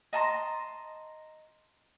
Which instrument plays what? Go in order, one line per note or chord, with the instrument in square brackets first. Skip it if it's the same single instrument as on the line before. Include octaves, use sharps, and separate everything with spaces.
[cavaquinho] D#5 A5 A#5 C6